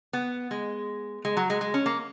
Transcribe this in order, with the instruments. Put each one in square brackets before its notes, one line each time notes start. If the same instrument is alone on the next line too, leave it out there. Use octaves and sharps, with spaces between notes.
[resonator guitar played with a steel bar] B3
G#3
G#3
F#3
G#3
G#3
C#4
A#3